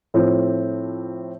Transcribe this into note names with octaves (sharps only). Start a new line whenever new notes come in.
A2 F3 C4